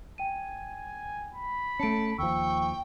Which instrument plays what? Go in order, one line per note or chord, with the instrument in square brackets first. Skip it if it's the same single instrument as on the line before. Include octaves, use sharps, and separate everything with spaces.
[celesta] G5 D#7 [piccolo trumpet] G#5
[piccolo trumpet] B5
[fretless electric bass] A3 C#4 [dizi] A5 [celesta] C#7 D7
[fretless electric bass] D#2 F3 [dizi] G5 [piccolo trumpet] C#6 [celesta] E6